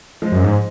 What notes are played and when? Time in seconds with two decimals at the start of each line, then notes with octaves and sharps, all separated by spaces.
0.22 F3 G#3
0.32 F#2
0.44 G#2